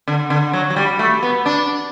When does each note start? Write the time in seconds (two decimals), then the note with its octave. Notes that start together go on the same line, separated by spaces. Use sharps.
0.08 D3
0.30 D3
0.53 F#3
0.70 F#3
0.76 G3
0.99 A3
1.22 B3
1.46 D4